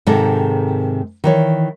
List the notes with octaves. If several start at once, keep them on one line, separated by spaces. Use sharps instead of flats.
G#2 C3 D#3 G#3 A4 A#4
D#3 E3 C#5